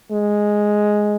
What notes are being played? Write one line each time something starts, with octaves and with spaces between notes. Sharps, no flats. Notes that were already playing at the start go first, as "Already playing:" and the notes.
G#3